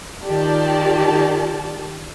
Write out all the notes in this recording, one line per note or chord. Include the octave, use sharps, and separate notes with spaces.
D#3 F4 G4 D5 A5